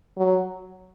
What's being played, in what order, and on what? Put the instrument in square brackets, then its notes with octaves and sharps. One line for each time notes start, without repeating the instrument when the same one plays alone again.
[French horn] F#3